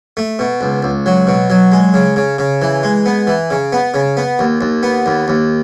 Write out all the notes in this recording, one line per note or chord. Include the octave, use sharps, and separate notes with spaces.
A3
B2
C#2
C#2
F#3
B2
F#3
G#3
C#3
C#3
C#3
E3
G#3
B3
E3
C#3
B3
C#3
B3
D#2
D#2
B3
D#2
D#2